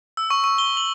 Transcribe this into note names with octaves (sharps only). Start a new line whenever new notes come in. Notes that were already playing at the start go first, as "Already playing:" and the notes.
E6
C#6
C#6
G7
F#7